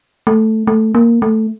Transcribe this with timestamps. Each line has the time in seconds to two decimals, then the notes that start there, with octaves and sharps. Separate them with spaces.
0.27 A3
0.67 A3
0.95 A#3
1.22 A3